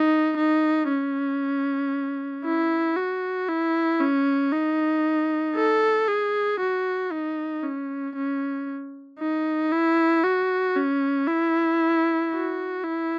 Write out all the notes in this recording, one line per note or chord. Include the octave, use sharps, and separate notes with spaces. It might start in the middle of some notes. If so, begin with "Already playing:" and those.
Already playing: D#4
D#4
C#4
E4
F#4
E4
C#4
D#4
A4
G#4
F#4
D#4
C#4
C#4
D#4
E4
F#4
C#4
E4
F#4
E4